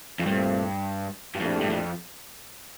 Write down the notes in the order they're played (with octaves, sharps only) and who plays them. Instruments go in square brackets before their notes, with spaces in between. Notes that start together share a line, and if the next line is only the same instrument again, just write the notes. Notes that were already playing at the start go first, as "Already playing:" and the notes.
[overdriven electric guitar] F2
[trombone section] C2 A#2 A3 C4 [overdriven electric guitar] G2
[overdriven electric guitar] G2
[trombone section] A#1 A2 A3 D4 G4 [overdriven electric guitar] F2
[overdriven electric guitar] G2
F2